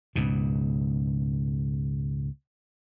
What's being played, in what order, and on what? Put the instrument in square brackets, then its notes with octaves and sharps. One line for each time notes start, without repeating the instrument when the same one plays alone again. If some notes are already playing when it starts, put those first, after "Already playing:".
[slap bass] C#2 G#2 B2